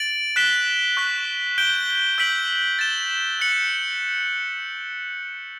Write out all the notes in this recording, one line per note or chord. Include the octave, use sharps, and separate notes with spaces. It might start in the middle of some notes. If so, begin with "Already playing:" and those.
Already playing: A6 D7 F#7
F#6 B6 E7 G7
C#6 F#6 B6
G6 D7 G7
E6 G6 B6 D7 F#7
A6 E7 G7
F#6 C#7 F#7